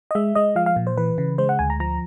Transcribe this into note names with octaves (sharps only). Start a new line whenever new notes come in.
D#5
G#3 E5
G#3 D#5
F3 F5
F5
A#2
C5
E3 B4
C#3
G#3 C5
F#5
D2 G#5
A#5
F3 A#5